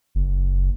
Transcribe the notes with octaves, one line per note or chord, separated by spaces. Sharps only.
F#1